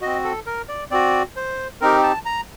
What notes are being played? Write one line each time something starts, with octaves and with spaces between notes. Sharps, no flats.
C4 F#4 D#5
A4
A#4
D5
C4 F#4 D5
C5
C4 D#4 G4 A#4
A5
A#5